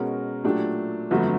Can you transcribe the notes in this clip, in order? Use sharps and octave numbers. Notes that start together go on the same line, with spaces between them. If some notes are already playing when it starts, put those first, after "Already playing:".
Already playing: B2 G#3 C#4 F#4 A#4
A#2 F#3 A3 D4 G4
G1 F2 D3 F#3 A3